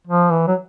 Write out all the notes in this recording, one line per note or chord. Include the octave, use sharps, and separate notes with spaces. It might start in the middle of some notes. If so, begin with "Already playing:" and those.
F3
E3
F#3